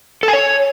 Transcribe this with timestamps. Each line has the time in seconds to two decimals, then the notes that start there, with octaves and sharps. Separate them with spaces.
0.23 A4
0.28 G#5
0.33 C#5